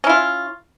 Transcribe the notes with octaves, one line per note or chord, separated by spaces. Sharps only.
C#4 E4 F4